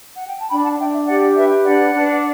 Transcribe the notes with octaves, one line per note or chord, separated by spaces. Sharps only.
F#5
G5
A5
D4 G5 B5
F#5 A5
D4 E5 G5
E5
G4 D5 F#5
B4 E5
D4 D5 F#5
D4